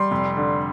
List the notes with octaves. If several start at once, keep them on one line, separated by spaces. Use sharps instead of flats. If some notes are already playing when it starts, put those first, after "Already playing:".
Already playing: G3 C6
F1
D3